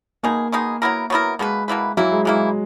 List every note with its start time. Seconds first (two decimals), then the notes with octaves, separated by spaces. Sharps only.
0.23 B2 G#3 A#3 D#4 G#4
0.52 B2 G#3 D#4 G#4
0.82 F#3 B3 E4 A#4
1.10 F#3 B3 E4 A#4
1.39 B2 G#3 A#3 E4 B4
1.68 B2 A#3 E4 B4
1.97 E3 F#3 A#3 E4
2.12 G#3
2.25 E3 G#3 A#3 E4